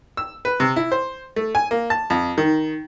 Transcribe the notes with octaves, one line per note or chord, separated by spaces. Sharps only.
E6
B4
C3
E4
C5
A3
G#5
A#3
A5
F2
D#3